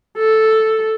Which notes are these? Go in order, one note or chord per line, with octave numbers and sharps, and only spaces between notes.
A4